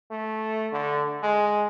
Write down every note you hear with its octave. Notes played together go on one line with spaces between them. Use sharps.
A3
D3
G#3